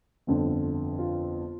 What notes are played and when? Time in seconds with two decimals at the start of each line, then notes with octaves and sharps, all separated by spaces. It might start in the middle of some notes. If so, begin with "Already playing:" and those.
0.27 G1 F2 D3
0.99 F4